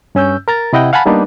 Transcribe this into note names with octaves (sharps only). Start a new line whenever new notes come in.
G2 C#4 E6 G6
A#4 A#5 A6
C3 E4 D#5 F#5 G5
F5 F#5 G#5 A5 B5
G3 A#3 B3 D4 D#4 B4